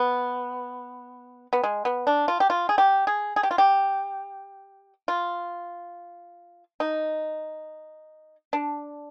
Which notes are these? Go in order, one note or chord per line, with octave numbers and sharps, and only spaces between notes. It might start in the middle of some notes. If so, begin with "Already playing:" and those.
Already playing: B3
B3
G#3
B3
D4
F4
G4
F4
G#4
G4
G#4
G#4
G4
F4
G4
F4
D#4
D4